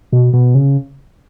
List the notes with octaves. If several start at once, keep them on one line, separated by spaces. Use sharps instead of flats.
B2
B2
C#3